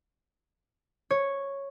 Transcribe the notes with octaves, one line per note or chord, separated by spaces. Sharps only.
C#5